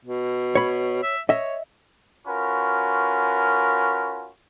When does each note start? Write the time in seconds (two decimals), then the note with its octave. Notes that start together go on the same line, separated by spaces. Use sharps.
0.05 B2
0.55 C#5 B5
1.03 E5
1.29 C#5 D#5 E5
2.27 C#4 F4 F#4 A#4 B4